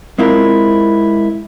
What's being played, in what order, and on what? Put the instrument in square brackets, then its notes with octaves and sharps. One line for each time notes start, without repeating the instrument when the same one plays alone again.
[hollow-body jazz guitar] G#3 C4 E4 F4 A#4